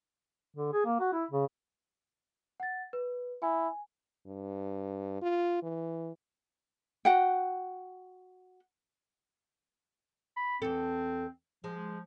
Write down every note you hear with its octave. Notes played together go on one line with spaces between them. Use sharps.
D3
G#4
A#3
F#4
E4
C#3
F#5 A6
B4
E4 G#5
G2
F4
E3
F#4 F#5 G5
B5
E2 C4 A4
F3 G#3